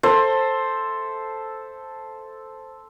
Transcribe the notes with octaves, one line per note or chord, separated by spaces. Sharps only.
A4 C5 E5